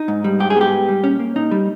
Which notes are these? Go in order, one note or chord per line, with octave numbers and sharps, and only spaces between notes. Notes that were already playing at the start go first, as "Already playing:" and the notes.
Already playing: D#4
G#2
G3
G#2 G4
G#4
B3 G4
G#2
G3
A#2 C#4
A#3
A#2 D#4
G3